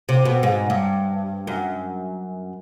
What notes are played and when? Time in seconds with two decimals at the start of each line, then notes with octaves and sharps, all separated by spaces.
0.09 C3
0.25 B2
0.43 G#2
0.70 G2
1.47 F#2